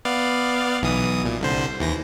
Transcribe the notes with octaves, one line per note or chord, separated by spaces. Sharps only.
B3 D5 F5
B1 E3 D#6
A#2
C2 D3 C5
D#2 E3 A#6